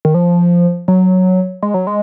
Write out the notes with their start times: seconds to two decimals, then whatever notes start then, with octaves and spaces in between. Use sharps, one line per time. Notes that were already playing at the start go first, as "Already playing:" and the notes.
0.05 D#3
0.14 F3
0.88 F#3
1.63 G#3
1.74 F#3
1.87 G#3